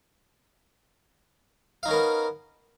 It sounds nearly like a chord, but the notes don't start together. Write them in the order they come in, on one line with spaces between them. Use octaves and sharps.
F5 D#4 C#4 A#4 B3